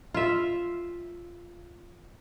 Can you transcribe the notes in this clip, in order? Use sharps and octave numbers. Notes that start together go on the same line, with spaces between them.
F4 E5